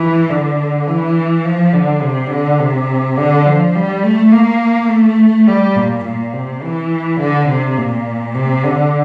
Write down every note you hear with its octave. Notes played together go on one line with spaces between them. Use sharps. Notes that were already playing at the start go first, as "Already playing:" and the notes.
Already playing: E3
D3
E3
F3
D3
C3
D3
C3
D3
F3
G3
A3
A#3
A3
G3
A#2
A#2
C3
E3
D3
C3
A#2
C3
D3